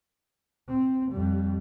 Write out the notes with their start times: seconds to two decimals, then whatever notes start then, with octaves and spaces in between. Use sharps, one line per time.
0.69 C4
1.11 F2 G3